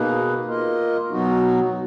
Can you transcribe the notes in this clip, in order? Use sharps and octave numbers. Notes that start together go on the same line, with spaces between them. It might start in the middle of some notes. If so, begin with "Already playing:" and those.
Already playing: B2 A#3 D#4 G#4 B4
A#3 F4 A#4 D#5
B2 F#3 B3 D#4 F#4